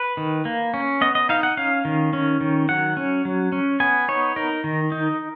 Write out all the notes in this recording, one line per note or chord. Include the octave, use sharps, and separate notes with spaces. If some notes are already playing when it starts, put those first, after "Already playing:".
Already playing: B4
D#3
A#3
C#4
B3 D#5
D#5
D#4 F5
F#5
C#4 F5
D#3
C#4
D#3
F#3 F#5
C#4
F#3
C#4
B3 G#5
D#4 C#5
D#4 A#4
D#3
D#4